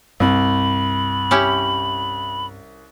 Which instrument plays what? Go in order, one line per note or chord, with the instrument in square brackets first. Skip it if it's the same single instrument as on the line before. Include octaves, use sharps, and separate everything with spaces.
[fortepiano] C2 [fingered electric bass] G2 C4 [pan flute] B5
[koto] C#4 E4 G4